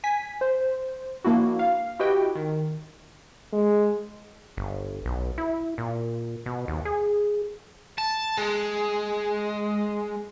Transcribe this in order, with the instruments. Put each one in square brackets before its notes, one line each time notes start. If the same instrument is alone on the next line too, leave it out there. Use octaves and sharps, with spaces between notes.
[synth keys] G#5 B6
C5
F3 A#3 D4 E4 F#4
F5
E4 F#4 G4 B4 D#5 G5
D#3
[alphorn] G#3
[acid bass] G1
B1
E4
A#2
B2
D#2
G#4
[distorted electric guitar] A5
G#3